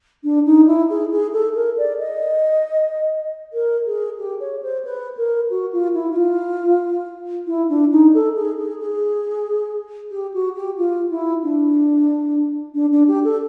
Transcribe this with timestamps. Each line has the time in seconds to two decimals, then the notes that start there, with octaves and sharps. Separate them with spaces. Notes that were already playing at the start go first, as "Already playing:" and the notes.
0.24 D4
0.46 D#4
0.67 E4
0.89 G#4
1.11 G#4
1.33 A4
1.55 A#4
1.77 D5
1.99 D#5
3.53 A#4
3.86 G#4
4.18 G4
4.40 C#5
4.62 C5
4.84 B4
5.17 A#4
5.50 F#4
5.72 F4
5.94 E4
6.11 E4
6.16 F4
7.47 E4
7.69 D4
7.91 D#4
8.14 A4
8.36 G#4
8.58 G#4
8.80 G#4
10.11 G4
10.34 F#4
10.55 G4
10.77 F4
11.10 E4
11.43 D4
12.74 D4
12.92 D4
13.08 G4
13.24 A4